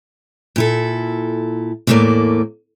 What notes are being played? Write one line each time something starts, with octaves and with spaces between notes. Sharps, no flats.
A#2 E4 A4
E2 A2 E3 A3 A#3 D5